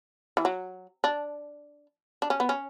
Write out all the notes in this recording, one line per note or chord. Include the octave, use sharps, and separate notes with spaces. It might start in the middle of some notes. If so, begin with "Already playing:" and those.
E3
F#3
D4
D4
C#4
B3
C#4